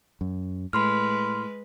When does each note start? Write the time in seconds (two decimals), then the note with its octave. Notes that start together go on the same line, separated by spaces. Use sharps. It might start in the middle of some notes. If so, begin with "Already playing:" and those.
0.21 F#2
0.73 A2 G#3 B4 B5 C6 F6